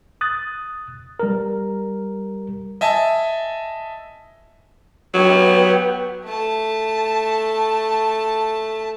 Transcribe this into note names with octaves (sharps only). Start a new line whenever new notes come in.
D#6 F#6 A6
G3 A#4
D#5 E5 G#5 A5
F#3 B3 G4
A3 A5